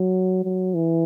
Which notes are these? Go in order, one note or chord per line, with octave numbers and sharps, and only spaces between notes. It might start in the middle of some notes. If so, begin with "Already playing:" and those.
Already playing: F#3
F#3
E3